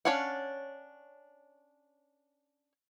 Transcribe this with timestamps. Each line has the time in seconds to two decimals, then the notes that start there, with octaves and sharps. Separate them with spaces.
0.05 C#4 D4 C#5 F5 F#5